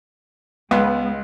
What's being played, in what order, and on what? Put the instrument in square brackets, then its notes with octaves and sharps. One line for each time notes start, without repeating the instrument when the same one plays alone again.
[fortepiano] C#2 [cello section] G#3 [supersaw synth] B3